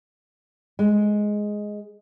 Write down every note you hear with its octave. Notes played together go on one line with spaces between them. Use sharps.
G#3